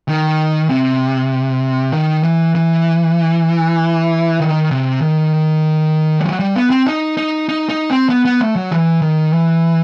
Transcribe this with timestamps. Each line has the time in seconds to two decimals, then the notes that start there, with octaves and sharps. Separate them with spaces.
0.08 D#3
0.69 C3
1.93 D#3
2.23 E3
2.55 E3
4.40 D#3
4.71 C3
5.01 D#3
6.20 G3
6.24 F#3
6.39 G3
6.56 B3
6.70 C4
6.86 D#4
7.17 D#4
7.49 D#4
7.69 D#4
7.90 C4
8.09 B3
8.25 B3
8.41 A3
8.56 F#3
8.71 E3
9.02 D#3
9.33 E3